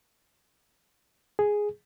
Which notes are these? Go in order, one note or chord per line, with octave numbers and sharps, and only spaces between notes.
G#4